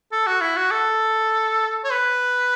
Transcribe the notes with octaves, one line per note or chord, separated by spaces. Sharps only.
A4
F#4
E4
F#4
A4
C#5
B4